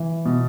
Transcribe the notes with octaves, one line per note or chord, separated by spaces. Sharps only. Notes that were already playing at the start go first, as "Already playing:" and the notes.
Already playing: E3
B2